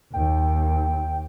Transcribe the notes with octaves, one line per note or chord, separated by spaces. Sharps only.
D#2 G5